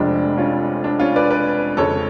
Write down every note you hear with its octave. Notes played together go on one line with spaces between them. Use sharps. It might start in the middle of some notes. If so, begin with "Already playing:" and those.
Already playing: F1 F2 F3 G#3 D4
C#4 F4
D4
C#4 F4
B4 D5
B4 D5
F2 C#3 G#3 A4 C#5